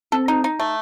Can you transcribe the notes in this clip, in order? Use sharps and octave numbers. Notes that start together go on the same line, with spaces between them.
C4 A4
D#4
D#4
A3